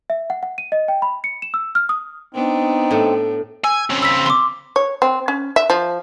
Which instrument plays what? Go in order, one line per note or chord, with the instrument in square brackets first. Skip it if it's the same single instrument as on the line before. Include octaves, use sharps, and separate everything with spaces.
[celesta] E5
F#5
F#5
D#7
D#5
G5
B5
C#7
E7
E6
F6
D#6
[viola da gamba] B3 D4 [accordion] C4 [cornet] D#4
[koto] A2
[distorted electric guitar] G#5 [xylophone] E6
[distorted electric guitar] C#3 C4
[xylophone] E6 B6
C6 D6
[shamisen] C#5
C4
C#4
E5
F3